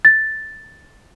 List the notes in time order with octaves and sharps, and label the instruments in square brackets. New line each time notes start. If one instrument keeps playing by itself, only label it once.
[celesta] A6